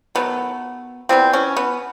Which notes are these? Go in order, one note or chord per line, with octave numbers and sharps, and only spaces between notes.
D#3 F#3 A3 B3
E3 G3 B3 C4
C#4
B3